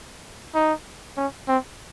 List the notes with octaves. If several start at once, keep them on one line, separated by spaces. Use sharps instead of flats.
D#4
C#4
C4